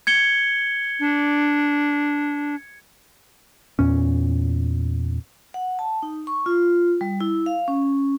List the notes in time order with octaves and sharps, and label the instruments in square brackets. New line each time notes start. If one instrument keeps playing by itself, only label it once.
[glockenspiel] G#6 C#7 G7
[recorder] D4
[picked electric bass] E2 A#2 C#4
[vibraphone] F#5
A5
D#4
C#6
F4
G3
E4
F5
C#4